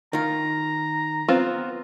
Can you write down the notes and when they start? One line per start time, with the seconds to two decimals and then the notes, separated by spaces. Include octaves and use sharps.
0.13 D#3 F4 A#5
1.28 B3 C4 F4